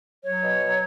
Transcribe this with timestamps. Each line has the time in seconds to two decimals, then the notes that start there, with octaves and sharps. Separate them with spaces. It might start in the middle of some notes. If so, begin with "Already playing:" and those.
0.24 F#3 C#5
0.43 B2
0.62 F#3